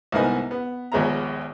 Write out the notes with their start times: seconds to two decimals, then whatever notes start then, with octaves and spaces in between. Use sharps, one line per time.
0.12 C2 G#2 A#3 B3 D#4 G#5
0.51 B3
0.92 A#1 D#2 G#3 B3 E5 A#5